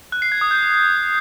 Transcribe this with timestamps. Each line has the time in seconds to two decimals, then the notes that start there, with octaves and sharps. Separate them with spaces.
0.12 F#6
0.22 C7
0.32 G#6
0.41 D#6
0.51 G6